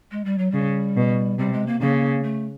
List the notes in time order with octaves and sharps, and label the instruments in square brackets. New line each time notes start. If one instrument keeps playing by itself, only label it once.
[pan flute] G#3
G3
F#3
[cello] C#3 [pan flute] G3
[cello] B2
[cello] C3 [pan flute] G3
[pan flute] G#3
A#3
[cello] C#3 [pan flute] A#3
[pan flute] A3